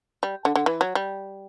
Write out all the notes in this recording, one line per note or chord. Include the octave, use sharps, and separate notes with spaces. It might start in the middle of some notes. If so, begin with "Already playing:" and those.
G3
D3
D3
E3
F#3
G3